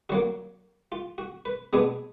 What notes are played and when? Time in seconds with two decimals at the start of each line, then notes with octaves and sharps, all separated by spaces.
0.09 D3 F#3 A#3 F#4
0.92 F4
1.18 F#4
1.45 B4
1.73 B2 G#3 B3 D4 G#4